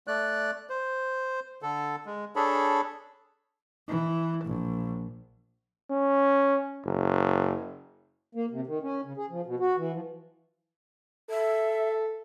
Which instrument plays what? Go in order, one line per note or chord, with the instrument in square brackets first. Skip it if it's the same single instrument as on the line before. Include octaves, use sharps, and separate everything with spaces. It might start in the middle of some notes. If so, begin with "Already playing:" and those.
[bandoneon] A3 D5 F#6
C5
D3 A4
G#3
D4 G#4 A4 C#5 B5
[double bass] E3
A#1
[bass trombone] C#4
F#1
[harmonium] A#3
C3
D#3
C#4
C#3
G#4
F3
B2
F#4
E3
F3
[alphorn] A4 [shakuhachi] E5